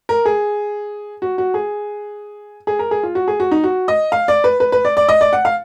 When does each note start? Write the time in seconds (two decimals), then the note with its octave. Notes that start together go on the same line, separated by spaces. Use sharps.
0.09 A#4
0.25 G#4
1.22 F#4
1.38 F#4
1.54 G#4
2.67 G#4
2.79 A#4
2.91 G#4
3.03 F4
3.15 F#4
3.28 G#4
3.40 F#4
3.51 D#4
3.64 F#4
3.88 D#5
4.12 F5
4.28 D5
4.44 B4
4.60 B4
4.72 B4
4.85 D5
4.97 D5
5.09 D#5
5.21 D5
5.33 F#5
5.45 F5